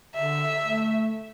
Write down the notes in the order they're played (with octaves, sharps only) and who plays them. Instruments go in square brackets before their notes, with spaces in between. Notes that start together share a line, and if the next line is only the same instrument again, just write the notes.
[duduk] D3 [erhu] E5
[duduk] A3